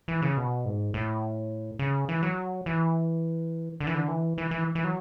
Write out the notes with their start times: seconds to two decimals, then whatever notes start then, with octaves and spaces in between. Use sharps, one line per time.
0.08 E3
0.22 C#3
0.37 B2
0.65 G#2
0.94 A2
1.79 C#3
2.09 E3
2.23 F#3
2.66 E3
3.80 D3
3.87 E3
3.95 D3
4.08 E3
4.38 E3
4.51 E3
4.75 E3
4.84 F#3